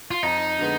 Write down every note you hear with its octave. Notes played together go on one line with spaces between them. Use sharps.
F4
F2 D#4
D3 G#3 B3